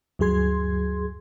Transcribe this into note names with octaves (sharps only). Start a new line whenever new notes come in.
D2 G2 F#3 G#4 C6 G#6